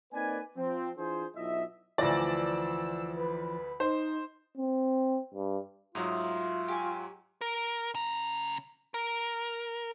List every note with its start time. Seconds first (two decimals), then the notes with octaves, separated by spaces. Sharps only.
0.13 A#3 C4 D#4 B4 D5 G#5
0.57 F3 C4
0.98 E3 D4 F4 G#4 C5
1.36 B1 E4 F4 D#5 E5
1.98 D2 E3 F3 D5 E6 A#6
3.16 B4
3.80 D#4 C5
4.57 C4
5.34 G2
5.95 G#2 F#3 A3 F4 A#5 D#6
6.68 G4 G#5 C#6
7.41 A#4
7.95 C#3 A#5
8.94 A#4